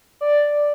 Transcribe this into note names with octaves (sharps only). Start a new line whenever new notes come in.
D5